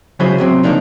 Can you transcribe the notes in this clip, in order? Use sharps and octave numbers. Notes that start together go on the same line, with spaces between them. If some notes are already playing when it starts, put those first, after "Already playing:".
C#3 F#3 G#3 E4 G#4 C5
C3 F#3 C4
C#3 F3 A#3 D4 D#4